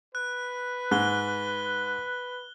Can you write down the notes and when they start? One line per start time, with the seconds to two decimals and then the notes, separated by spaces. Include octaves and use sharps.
0.15 B4 F#6
0.91 G#2 F#6 G7